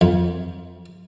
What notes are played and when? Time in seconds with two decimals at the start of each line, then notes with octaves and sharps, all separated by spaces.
0.01 F2